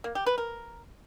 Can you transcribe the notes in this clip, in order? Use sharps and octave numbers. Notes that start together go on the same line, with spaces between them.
A#3
G4
B4
A#4